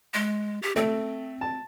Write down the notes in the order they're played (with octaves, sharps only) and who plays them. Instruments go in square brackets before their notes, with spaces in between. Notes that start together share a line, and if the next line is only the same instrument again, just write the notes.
[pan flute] G#3
G4
[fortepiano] A3 [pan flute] C4
[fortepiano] A5